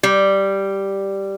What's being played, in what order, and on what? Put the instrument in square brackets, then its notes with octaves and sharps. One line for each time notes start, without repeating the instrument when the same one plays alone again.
[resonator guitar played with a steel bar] G3